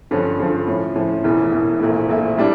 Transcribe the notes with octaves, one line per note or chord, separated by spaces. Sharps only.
G2 D3 F3 C#4
G2 D3 F3 C#4
A2 F3 C#4
A2 F3 C#4
E1 E2 E3
E1 E2 E3
A#1 A#2 A3 E4
A#1 A#2 A3 E4
A2 G3 D4